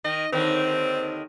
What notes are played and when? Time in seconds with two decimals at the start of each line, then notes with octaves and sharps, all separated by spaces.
0.04 D#3 D#5
0.32 D#2 D3 D#3 C4